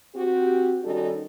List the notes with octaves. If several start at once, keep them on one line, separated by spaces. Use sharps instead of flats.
C4 F#4 G4
D#3 G3 C#4 D#4 F#4 A4